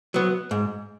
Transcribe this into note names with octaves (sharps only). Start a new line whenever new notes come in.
F#3 B3
G#2